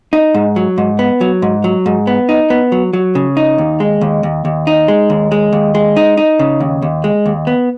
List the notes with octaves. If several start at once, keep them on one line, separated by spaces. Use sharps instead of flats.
D#4
G#2
F#3
G#2
B3
F#3
G#2
F#3
G#2
B3
D#4
B3
F#3
F#3
C#3
D#4
D#2
G#3
D#2
D#2
D#2
D#4
G#3
D#2
G#3
D#2
G#3
D#4
D#4
C#3
D#2
D#2
G#3
D#2
B3